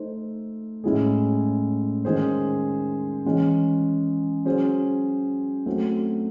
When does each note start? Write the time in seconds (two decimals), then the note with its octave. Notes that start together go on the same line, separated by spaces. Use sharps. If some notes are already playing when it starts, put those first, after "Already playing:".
Already playing: A3 D#4 A4 C5
0.84 A2 G#3 C#4 E4 G#4
2.05 D#3 G#3 C#4 G#4 C5
3.25 E3 G#3 C#4
4.45 F#3 C#4 G#4 C5
5.66 F#3 A3 C4